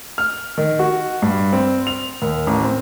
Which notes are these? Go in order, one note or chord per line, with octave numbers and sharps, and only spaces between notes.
F6
D#3
F#4
G2
C4
F7
D#2
A1
C4